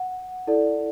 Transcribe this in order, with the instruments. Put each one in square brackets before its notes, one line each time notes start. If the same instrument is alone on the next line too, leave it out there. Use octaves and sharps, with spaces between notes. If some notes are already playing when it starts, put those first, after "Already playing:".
Already playing: [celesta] F#5
E4 A4 D5